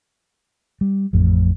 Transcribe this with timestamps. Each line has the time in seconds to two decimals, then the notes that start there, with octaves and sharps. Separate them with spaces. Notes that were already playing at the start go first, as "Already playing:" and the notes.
0.81 G3
1.13 A1 F2 A2